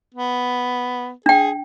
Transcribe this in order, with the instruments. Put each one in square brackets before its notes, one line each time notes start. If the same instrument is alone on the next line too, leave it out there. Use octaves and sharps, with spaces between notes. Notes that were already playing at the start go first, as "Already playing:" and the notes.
[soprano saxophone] B3
[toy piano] D4 G5 [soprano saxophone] G#4